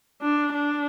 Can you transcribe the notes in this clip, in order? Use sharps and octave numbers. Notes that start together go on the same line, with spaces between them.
D4
D4